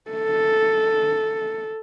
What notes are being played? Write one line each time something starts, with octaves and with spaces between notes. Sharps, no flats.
A4